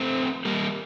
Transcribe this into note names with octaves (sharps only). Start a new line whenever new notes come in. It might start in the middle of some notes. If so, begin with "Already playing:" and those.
Already playing: A3 C4
G3 A#3